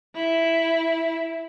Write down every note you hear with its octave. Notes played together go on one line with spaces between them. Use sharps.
E4